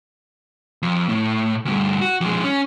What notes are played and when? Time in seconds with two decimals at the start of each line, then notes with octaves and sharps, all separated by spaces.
0.82 F2
1.09 A2
1.65 D2 G2
2.01 F#4
2.21 F2 G#3
2.44 C#4